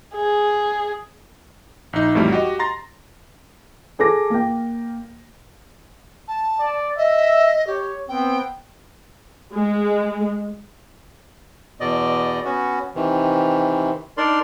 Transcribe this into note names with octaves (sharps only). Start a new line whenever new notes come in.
G#4
A#1 D#4
F2 A2 E3 F#3 G3
F#4 G4 D#5
A#5 C6 A6 A#6
G#4 A4 D6 A#6
A#3 G5
A5
D5
D#5 E5
G4 C#5
B3 C4 G5
G#3
E2 B2 D5 D#5
B3 C#4 F#4
C3 D#3 E3
D4 D#4 A#4 D5 C6